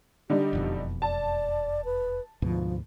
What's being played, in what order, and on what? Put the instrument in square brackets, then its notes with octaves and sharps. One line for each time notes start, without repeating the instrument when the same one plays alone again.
[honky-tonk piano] D3 G3 D#4 [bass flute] G4
[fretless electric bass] E1 F2 B2
[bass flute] D5 [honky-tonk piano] A5
[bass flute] B4
[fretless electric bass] D2 G#2 B2 [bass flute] F3